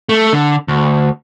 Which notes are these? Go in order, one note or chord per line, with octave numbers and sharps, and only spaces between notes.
A3
D3
D2